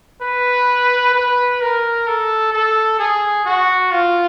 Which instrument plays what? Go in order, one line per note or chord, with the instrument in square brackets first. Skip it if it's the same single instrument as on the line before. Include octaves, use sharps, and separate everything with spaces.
[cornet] B4
B4
A#4
A4
A4
G#4
F#4
F4